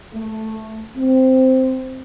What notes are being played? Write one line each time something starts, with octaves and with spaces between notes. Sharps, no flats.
A3
C4